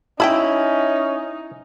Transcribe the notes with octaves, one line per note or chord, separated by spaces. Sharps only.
C#4 D#4 E4 G5 A5 B5